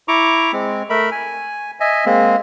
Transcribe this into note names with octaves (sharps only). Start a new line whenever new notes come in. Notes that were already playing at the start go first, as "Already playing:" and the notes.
E4 A#5 C#6 D6
G#3 C4
A3 A#4 E5 B5
G#5
D#5 E5 G#5
G#3 A#3 C4